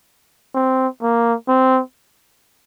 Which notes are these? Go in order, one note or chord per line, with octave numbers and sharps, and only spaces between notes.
C4
A#3
C4